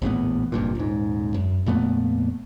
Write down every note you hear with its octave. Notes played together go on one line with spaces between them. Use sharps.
A#1 E2 A2 B3
F1 G2 A#2
D#1 G#2
F#2
F2 A#2 A3 B3